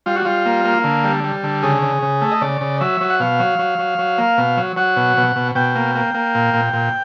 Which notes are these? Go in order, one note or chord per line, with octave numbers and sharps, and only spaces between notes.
G3 F4
F#4
G3 F4
A#3
A#3
D3
G3
G3
D3
C#3 G#4
C#3
C#3
A3
D#5
C#3 D5
C#3
F#3 E5
F#3
F#5
B2 F5
F#3
F#3
F#3
F#3
A#3
B2
F#3
F#3 F#5
B2
B2
B2
B2 G5
A#3
A#3
A#3
A#2
A#2
A#2